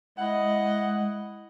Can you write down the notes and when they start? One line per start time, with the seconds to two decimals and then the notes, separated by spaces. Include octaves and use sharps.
0.18 G#3 E4 D#5 F#5